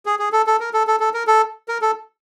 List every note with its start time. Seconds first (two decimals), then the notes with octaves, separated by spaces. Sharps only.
0.06 G#4
0.19 G#4
0.32 A4
0.47 A4
0.60 A#4
0.74 A4
0.87 A4
1.00 A4
1.14 A#4
1.27 A4
1.69 A#4
1.82 A4